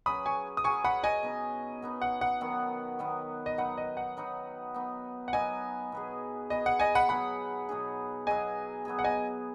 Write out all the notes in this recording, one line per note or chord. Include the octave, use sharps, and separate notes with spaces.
F#3 C#4 G#4 B4 B5 D#6
G#5 C#6
D#6
F#3 C#4 G#4 B4 G#5 C#6
F#5 B5
D#5 G#5
B2 B3 D#4
B2 B3 D#4
F#5
F#5
D#3 F#3 B3
D#3 F#3 B3
D#5
F#3 D#4 B4 F#5
D#5
F#5
F#3 D#4 B4
F#3 B3 D#4
F#5
F#3 B3 D#4 D#5 G#5
B2 B3 G#4
B2 B3 G#4 D#5
F#5
D#5 G#5
F#5 B5
B2 F#3 D#4 G#4 F#5 B5
B2 F#3 D#4 G#4
F#3 B3 G#4 D#5 G#5
F#3 B3 G#4
F#5
D#5 G#5